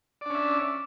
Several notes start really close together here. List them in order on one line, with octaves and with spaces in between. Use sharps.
D5 D4 C#4 E5